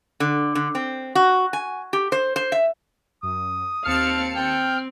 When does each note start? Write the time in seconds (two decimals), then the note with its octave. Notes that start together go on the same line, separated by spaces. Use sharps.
0.20 D3
0.55 D3
0.75 C4
1.15 F#4
1.53 G#5
1.93 G4
2.12 C5
2.36 C5
2.52 E5
3.23 F#2 D#6
3.85 D#2 C4 F5 A5 F6 C#7
4.36 C4 G5